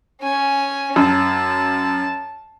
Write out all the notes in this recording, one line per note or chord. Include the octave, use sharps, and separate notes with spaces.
C#4 G#5
F#2 A5